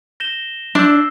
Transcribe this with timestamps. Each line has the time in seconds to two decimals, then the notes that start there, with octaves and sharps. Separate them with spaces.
0.20 G6 A#6 E7 G7
0.75 D4 E6 G6 C7